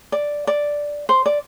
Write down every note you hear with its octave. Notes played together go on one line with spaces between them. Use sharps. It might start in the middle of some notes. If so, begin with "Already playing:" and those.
D5
D5
C5
D5